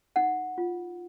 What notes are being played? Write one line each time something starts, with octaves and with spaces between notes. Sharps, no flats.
D#4 F#5
F4